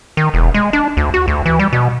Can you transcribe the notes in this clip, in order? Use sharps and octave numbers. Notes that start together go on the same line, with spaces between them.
D#3
E1
G#3
D4
D2
F#4
D2
E3
G3
B2